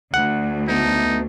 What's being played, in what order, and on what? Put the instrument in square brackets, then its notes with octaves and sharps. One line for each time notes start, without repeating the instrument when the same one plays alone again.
[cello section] D2 [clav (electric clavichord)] F#5
[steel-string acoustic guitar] A3 B3 A#4 [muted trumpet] D#4